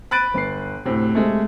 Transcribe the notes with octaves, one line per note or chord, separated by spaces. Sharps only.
B5 F#6 A6 D7 D#7
G1 B4 C7
D2 A2 C3
C3 G#3 A3